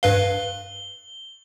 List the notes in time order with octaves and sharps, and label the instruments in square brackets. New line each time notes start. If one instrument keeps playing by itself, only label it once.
[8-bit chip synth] G2 B4 F5 [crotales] G7